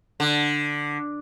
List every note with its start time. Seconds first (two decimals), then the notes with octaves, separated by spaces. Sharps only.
0.20 D3